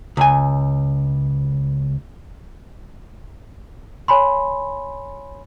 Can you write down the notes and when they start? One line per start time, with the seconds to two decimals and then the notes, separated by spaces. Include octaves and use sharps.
0.17 C#2 G#5
4.08 C#5 G#5 B5 C6